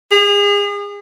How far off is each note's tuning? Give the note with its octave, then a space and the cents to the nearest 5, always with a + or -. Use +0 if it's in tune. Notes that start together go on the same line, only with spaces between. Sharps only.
G#4 -35